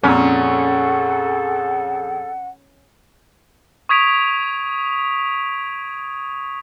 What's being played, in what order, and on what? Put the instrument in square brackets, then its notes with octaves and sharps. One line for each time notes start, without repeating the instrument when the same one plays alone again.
[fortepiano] F2 A#2 [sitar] C#4 [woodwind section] G#4 A4 [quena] F#5
[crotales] C#6 D#6 G#6 B6 D7 F7